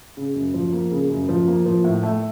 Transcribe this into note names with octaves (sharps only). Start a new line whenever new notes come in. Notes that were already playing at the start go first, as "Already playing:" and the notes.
C#3
F#2
F3
A#3
C#3
F#2
F3
A#3
F3
A2
A3